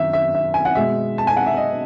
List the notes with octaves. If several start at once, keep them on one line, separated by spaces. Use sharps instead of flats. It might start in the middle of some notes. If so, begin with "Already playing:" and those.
Already playing: F#2 D#3 E5
E5
E5
G#5
F#5
B2 G#3 E5
A5
G#5
F#5
E5
D#5